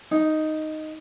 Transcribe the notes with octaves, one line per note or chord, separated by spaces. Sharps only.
D#4